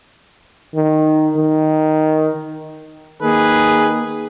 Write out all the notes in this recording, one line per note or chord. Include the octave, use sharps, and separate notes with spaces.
D#3
D#3
D#3 A#3 G#4 B4